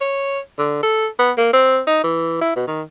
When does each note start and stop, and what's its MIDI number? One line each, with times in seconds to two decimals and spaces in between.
0.01 0.40 73
0.59 0.80 50
0.83 1.07 69
1.19 1.32 59
1.38 1.52 58
1.53 1.80 60
1.87 2.03 63
2.04 2.41 52
2.41 2.55 64
2.56 2.67 47
2.67 2.82 51